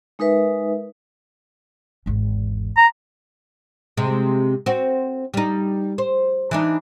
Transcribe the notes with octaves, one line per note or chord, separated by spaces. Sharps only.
G#3 D#4 A#4 B4 E5
G#1 E2
A#5
C3 G#3
C4 F#4
G3 D#4
C5
E3 D4 D#4